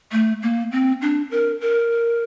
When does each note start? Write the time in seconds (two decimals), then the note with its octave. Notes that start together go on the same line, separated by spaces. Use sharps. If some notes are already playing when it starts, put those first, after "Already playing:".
0.12 A3
0.42 A#3
0.72 C4
1.01 D4
1.31 A#4
1.61 A#4